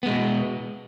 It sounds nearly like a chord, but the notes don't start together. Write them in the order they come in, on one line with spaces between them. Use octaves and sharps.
B3 G#3 B2